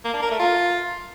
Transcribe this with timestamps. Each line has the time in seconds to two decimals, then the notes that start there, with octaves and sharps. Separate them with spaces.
0.05 A#3
0.13 D4
0.22 A#4
0.31 A3
0.39 F4